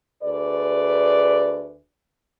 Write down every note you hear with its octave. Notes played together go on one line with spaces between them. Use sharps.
D2 G#4 B4 D5